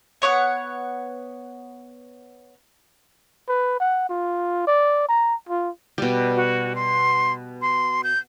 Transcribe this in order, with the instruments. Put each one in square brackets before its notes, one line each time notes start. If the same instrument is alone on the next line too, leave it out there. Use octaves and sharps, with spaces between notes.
[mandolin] B3 C#5 E5 F#5
[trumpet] B4
F#5
F4
D5
A#5
F4
[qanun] B2 G3
[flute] F#4
C6
C6
G6